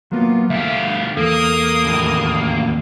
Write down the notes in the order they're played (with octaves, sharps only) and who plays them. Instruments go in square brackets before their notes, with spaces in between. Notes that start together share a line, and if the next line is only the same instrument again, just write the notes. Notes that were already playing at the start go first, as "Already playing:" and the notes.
[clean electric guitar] F#3 A#3 B3 [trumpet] F4
[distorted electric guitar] D2 G4 [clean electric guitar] E5 [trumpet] F5
[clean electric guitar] E2 A4 [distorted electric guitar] A#3 [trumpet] D#6
[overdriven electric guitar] D#2 A2